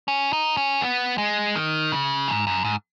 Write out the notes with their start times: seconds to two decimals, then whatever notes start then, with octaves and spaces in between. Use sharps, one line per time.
0.08 C#4
0.33 D#4
0.57 C#4
0.81 B3
1.18 G#3
1.55 D#3
1.92 C#3
2.28 G#2
2.47 F#2
2.64 G#2